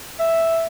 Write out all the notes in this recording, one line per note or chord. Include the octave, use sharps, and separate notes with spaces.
E5